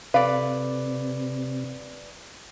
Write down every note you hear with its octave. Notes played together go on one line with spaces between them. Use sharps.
C3 A4 B4 D5 F5